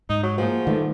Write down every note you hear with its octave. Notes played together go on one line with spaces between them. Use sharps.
G#2 D#4
F#3
F3 A#3 G#4 F#5
G2 D#3 A3 A4